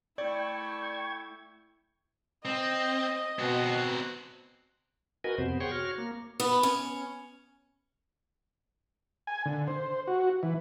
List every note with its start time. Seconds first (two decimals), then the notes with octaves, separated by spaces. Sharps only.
0.18 A3 E4 D5 G5 C#6 G#6
2.45 C4 D#5
3.39 B2 C4 F#4
5.24 F#4 A#4 B4 D#5 G#5
5.38 F2 C3 B3 C5
5.60 G#4 C#5 F#5 G5 C6 C#6
5.72 F#4 C#5 F6
5.98 A#3
6.40 B3
6.63 C#4
9.27 G#5
9.45 D3
9.68 C5
10.08 F#4
10.43 E3